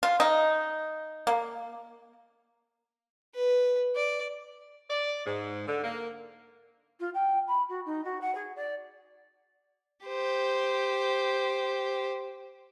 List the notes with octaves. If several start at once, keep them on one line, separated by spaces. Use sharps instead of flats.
F4
D#4
A#3
B4
D5
D5
G#2
D3
A#3
F4
G5
B5
F#4
D#4
F#4
F#5
G#4
D5
G4 C5